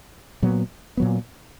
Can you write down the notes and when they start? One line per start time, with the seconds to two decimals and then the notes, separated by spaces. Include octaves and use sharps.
0.42 A#2 F#3 B3
0.97 A#2 F#3 B3